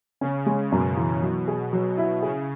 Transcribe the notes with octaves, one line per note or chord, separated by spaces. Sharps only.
C#3 C#4
G#3
F#2 B2
E3
F#3
G#4
F#3
E4
C#3 G#4